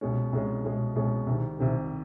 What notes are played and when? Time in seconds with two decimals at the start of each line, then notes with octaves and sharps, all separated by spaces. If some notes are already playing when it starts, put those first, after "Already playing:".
0.01 C2 B2 G#3 C#4
0.32 C2 B2 G#3 C#4
0.64 C2 B2 G#3 C#4
0.95 C2 B2 G#3 C#4
1.27 C2 C3 D#3
1.59 C2 C3 D#3